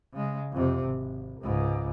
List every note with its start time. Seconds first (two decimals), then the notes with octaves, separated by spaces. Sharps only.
0.13 C#3 G#3
0.52 F2 C3
0.84 G#1
1.41 C#2 G#2